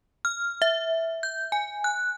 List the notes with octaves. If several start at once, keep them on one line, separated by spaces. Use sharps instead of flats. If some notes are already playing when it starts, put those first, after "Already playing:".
F6
E5
G6
G#5
F#6